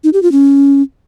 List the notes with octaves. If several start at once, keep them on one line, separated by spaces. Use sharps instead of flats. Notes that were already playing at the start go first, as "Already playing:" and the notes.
D#4
G4
F4
C#4